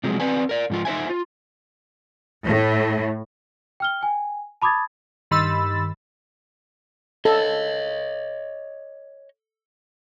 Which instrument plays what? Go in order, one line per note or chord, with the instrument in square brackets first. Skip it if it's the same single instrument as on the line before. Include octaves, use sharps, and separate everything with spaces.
[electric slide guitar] C3 F3 F#3 G#3
C4 B4 D5 G#5
A#4 D5
G#2 F3 F4
D#4 C5 E5 G#5
F4
[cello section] A2
[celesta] G5 F6 G7
G5 G#5
A5 B5 D6 D#6 G#6 A6
[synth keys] G2 D#3 B5 C6 E6 A6
[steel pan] A4 [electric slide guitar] C#5 D#5